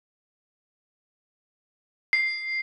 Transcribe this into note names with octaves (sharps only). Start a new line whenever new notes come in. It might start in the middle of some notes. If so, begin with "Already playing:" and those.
C7